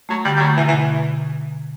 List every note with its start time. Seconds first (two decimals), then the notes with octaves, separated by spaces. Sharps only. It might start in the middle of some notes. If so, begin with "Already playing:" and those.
0.09 F#3 A3
0.25 D3 G3
0.36 G3
0.41 F#3 A3
0.57 B2 E3
0.68 E3
0.73 B2